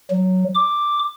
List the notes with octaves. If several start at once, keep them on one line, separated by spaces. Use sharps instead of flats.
F#3
D6